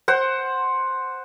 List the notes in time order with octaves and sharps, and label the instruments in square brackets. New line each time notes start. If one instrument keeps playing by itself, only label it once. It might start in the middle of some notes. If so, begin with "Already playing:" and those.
[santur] C5 F#5